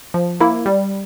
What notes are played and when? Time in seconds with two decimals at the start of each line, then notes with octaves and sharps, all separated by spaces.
0.14 F3
0.40 A#3 E4
0.66 G3